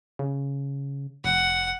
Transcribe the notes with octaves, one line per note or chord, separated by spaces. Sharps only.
C#3
F1 F#5